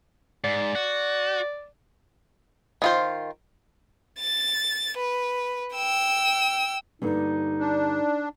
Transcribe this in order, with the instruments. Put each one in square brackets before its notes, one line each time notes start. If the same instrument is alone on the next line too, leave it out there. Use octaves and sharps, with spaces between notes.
[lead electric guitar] G#2 [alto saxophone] D5
[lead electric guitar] F#4
[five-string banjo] D#3 F4 C5
[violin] A6
B4
G5 E6
[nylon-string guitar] G2 D3 A#3 [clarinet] D#4
[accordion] D4